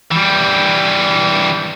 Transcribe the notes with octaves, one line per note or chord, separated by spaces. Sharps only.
E3 G3